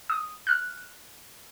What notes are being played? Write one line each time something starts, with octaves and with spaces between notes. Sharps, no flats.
D#6
F6 F#6